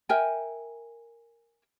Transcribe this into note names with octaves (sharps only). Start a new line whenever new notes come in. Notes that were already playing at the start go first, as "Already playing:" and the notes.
A#4 E5 G5 G#5